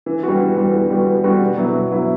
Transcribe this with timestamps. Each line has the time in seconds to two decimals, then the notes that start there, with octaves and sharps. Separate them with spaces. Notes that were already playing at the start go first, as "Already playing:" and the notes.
0.06 E3
0.23 G3 B3 F#4
0.40 E3
0.57 G3 B3 F#4
0.73 E3
0.90 G3 B3 F#4
1.07 E3
1.24 G3 B3 F#4
1.41 B2
1.58 F#3 B3 E4
1.74 B2
1.91 F#3 B3 E4